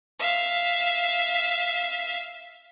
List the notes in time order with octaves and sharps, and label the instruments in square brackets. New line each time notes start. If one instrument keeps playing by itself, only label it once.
[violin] E5 F5